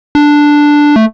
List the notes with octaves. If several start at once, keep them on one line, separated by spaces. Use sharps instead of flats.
D4
A3